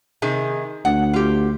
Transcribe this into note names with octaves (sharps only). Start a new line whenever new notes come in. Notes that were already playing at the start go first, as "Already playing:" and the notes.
C3 D#3 G#4
D2 F#5
F4 G4